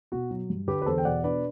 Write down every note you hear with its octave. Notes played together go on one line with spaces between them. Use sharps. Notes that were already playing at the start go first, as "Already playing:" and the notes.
B2 F#4
F#3
G2
D3 G4 B4
B4
E2 A4 C5
G5
B2 D5 F#5
D4 B4 D5